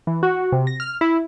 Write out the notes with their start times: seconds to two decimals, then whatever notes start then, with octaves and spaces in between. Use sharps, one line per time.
0.07 E3
0.23 F#4
0.52 C3
0.67 A#6
0.80 F6
1.01 E4